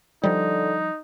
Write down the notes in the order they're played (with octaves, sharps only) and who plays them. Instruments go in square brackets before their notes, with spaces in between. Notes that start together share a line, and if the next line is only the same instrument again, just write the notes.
[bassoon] D3 [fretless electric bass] F3 G3 [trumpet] D#4